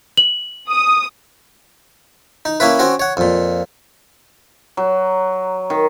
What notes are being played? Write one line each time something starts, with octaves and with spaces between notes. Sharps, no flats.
F#7
D#6
D#4
A#3 C#4 E4 B4
C4 C#4 F#4
C#5 F#5
F2 A#2
F#3
D#3